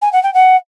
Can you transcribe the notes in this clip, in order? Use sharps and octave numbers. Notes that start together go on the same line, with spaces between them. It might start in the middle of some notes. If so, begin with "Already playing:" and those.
G#5
F#5
G5
F#5